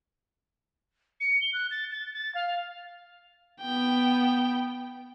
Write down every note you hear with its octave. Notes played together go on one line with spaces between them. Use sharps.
C#7
G7
F#6
A6
A6
A6
F5
B3 G5